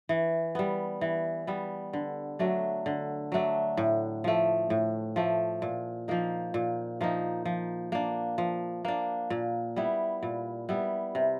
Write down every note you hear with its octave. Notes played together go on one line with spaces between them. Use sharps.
E3
G3 B3
E3
G3 B3
D3
F#3 A3 D4
D3
F#3 A3 D4
A2
F3 A3
A2
F3 A3
A#2
F3 A#3 D#4
A#2
F3 A#3 D#4
F3
A#3 D4
F3
A#3 D4
A#2
G3 B3 E4
A#2
G3 B3 E4
C3